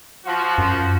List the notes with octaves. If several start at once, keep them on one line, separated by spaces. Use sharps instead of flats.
F3 F#4
F#2